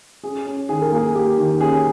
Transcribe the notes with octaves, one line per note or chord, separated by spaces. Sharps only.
C#4 G#4
C#4
D#3 G#4
A#4
A#3 G#4
A#3 G4
D#3
C#4 G#4